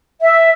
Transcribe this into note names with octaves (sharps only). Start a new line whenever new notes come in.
E5